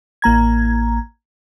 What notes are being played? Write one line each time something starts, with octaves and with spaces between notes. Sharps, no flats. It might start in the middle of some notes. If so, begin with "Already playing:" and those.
A1 A#3 A#5 G#6